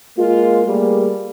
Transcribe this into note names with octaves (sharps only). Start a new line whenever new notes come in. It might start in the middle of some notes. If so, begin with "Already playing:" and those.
G#3 A#3 F4
G3 A3 A#3 G#4